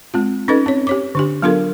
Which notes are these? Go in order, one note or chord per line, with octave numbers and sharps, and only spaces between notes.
G#3 C4 F4
C#4 D#4 A4 B4 D#5
C4 C#5
G4 C#5 D6
D3 D4 G4
F#3 B3 D4 F4 A4 A#4